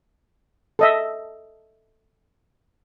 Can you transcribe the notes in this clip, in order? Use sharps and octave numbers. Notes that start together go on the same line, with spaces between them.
A4 D#5 E5